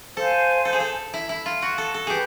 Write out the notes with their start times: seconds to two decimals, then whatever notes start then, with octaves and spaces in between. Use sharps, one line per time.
0.17 A4 C5 F5 G#5
0.65 A4
0.73 G#4
0.80 A4
1.14 E4
1.29 E4
1.46 F4
1.62 F#4
1.78 A4
1.94 A4
2.07 G4 G#4 B4